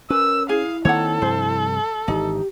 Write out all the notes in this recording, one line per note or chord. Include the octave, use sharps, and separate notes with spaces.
C#4 A#4 B4 E6
E4 G#4 F5
D#3 A#3 C4 A4 C#5 F#5
G2 C3 F3 C5
G#1 D3 E3 D#4 G4